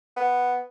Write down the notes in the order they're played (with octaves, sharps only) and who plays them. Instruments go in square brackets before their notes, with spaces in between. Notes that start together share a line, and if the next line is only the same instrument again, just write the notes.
[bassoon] B3